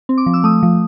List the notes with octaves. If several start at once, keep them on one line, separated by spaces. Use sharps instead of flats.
C4
D6
F3
E6
A3 D#6
F3